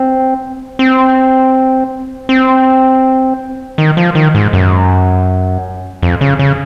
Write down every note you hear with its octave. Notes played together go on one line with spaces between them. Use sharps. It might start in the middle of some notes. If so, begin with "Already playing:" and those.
Already playing: C4
C4
C4
D#3
F3
D#3
G#2
F#2
F2
C#3
C#3